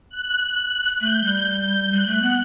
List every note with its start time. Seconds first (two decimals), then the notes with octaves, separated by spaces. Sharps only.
0.10 F#6
1.01 A3 G6
1.24 G3
1.47 G6
1.92 G3 F#6
2.07 A3
2.23 B3